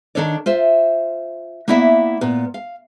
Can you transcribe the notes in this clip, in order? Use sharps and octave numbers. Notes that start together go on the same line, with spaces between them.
D#3 E3 D4 A4 C#5 D5
F4 C5 E5
A#3 B3 E4 D5 E5
A#2 B3
F5